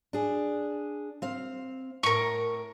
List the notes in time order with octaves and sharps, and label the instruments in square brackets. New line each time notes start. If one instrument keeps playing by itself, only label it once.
[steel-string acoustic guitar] D4 G#4
C4 F5
[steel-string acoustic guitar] A2 [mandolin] A#4 C#6